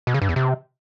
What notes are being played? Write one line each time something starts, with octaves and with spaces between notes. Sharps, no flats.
B2
C#3
G2
E2
C3